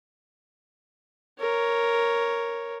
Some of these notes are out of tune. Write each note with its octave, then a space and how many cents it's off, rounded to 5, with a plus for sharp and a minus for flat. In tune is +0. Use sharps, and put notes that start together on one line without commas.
A#4 +0 C#5 +0